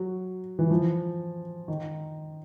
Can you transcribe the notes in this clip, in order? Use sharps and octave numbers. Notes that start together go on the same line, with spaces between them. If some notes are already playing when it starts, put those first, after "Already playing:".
Already playing: F#3
E3
F3
D#3